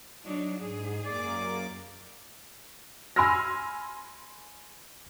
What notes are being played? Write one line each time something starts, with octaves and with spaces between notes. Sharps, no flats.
F#3 D4 D#4
G#2 G#4
F#2 A#3 D5 D6
G#5 B5 C6 E6 F6 A#6